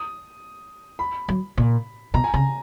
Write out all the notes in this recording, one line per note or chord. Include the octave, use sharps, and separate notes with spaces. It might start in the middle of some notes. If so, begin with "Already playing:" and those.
Already playing: D#6
B5
F#3
A#2
B2 A#5
G#5
C#3 A#5